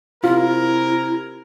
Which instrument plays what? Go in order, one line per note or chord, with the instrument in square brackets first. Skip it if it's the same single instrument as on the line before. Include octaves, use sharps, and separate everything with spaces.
[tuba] C3 [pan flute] E4 [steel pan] F4 [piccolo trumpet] A#4